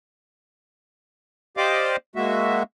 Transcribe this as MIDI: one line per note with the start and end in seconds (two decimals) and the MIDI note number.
1.57 1.96 67
1.57 1.96 72
1.57 1.96 74
1.57 1.96 75
1.57 1.96 77
1.57 1.96 86
2.16 2.63 56
2.16 2.63 58
2.16 2.63 66
2.16 2.63 76